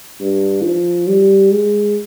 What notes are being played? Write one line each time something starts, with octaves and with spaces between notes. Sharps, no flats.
G2
F3
G3
G#3